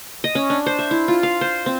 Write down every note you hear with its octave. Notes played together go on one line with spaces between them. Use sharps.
D#5
C#4
D4
C5
E5
E4
F4
F5
C5
C4